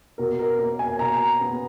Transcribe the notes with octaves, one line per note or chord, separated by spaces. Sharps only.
B2 A#4
A#4
A#3 A#4
G#5
B2 A#5
B3